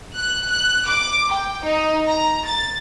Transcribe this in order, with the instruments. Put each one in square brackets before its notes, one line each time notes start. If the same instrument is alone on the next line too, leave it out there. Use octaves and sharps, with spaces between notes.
[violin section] F#6
F#6
D6
G5
D#4
A#5
A6